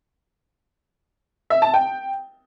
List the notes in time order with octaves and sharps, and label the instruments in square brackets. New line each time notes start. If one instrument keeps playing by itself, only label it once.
[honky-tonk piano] E5
A5
G5